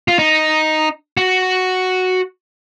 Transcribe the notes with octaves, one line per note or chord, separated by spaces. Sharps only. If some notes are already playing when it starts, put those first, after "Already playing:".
F4
D#4
F#4